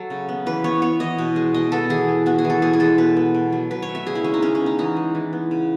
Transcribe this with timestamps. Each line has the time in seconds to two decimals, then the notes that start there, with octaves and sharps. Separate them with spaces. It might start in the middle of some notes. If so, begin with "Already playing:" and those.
Already playing: F#3 A4
0.10 C#3
0.29 B3
0.46 E3 B4
0.64 B3 C#5
0.82 B3 C#5
1.00 E3 D#5
1.18 B2
1.36 G#3
1.54 B2 D#5
1.72 B3 A4
1.90 E3 G#4
2.08 B3
2.26 B3 F#4
2.39 G#4
2.45 E3
2.50 A4
2.62 B2 G#4
2.73 G#4
2.80 G#3 A4
2.98 B2 B4
3.17 B3
3.34 B2
3.52 F#3
3.71 B2 B4
3.82 C#5
3.89 A3
3.95 E5
4.06 C#3 G#4
4.15 E4
4.24 G#3 C#4
4.34 D#4
4.42 C#3 C#4
4.55 C#4
4.61 B3
4.66 D#4
4.79 E3 D#4
4.97 G#3
5.15 E3
5.33 B3
5.51 C#3